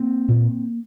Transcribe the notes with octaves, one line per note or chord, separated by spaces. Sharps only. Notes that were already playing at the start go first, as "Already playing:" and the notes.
Already playing: A#3 C4
A#2